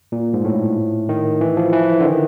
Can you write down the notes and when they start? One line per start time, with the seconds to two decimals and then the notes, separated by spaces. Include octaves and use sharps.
0.12 A#2
0.34 G#2
0.45 A2
1.09 D#3
1.41 E3
1.57 F3
1.73 E3
2.00 D3
2.05 D#3